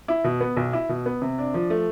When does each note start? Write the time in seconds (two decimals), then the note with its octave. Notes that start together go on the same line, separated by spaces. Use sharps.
0.08 E4
0.24 B2
0.41 B3
0.57 B1
0.73 E4
0.89 B2
1.06 B3
1.22 C3
1.38 D4
1.54 F3
1.70 A3